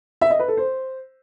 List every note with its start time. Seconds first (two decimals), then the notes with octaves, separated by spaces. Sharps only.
0.21 E5
0.30 D#5
0.39 B4
0.48 A4
0.57 C5